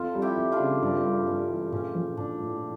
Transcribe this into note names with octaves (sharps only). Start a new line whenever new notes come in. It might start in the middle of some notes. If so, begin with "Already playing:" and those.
Already playing: F2 F4 A4
G3
E4 G4
F2
D4 F4
C#3
G2 D4
G3
G2 C#4
E3
A#1 C#4
F3
A#1 D4
A2